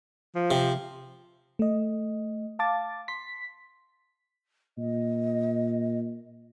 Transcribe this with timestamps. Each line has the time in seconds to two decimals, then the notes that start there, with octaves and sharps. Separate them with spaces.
0.35 F3
0.51 C3
1.59 A3 D#5
2.59 F5 A5 D6 A6
3.08 C6 B6
4.78 A#2 D#5